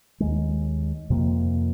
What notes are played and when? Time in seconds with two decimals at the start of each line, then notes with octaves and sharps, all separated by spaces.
0.20 D#2 D#3 G#3
1.10 F2 C3 F3 A#3